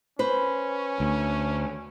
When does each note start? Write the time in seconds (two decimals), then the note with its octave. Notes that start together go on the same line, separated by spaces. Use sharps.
0.19 C#4 B4 C5
1.00 D2